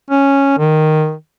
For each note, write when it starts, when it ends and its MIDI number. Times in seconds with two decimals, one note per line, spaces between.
0.11 0.57 61
0.58 1.13 51